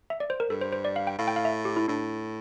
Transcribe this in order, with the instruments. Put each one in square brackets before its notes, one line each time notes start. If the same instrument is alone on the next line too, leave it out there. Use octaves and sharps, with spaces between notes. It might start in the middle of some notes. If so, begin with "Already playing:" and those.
[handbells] E5
D5
C5
A#4
[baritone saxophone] G2 [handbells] A4
[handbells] C5
C5
D5
F5
G5
[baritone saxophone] A2 [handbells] F5
[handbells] G5
F5
E5
G4
E4
[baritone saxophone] A2 [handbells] D4